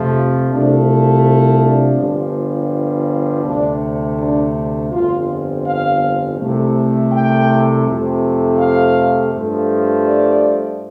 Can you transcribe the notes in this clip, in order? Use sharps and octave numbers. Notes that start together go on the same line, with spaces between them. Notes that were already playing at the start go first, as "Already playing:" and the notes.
Already playing: F2 C3 F3 A3
C2 C3 F3 A3 D4
D4
G1 G2 F3
D2 C3 A3 D4
D4
G1 F2 F3 F4
F5
C2 C3 A3
G5
F2 C3 A3
F5
G2 F3 A3
D5